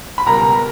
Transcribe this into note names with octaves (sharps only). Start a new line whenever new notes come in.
B5
C#2 B2 G3 A#4 A#5